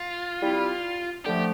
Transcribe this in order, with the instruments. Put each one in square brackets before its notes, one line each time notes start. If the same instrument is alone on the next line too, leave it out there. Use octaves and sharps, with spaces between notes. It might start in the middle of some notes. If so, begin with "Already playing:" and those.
Already playing: [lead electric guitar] F4
[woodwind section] G3 C4 E4
[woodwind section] D3 F3 A3 [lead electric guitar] G4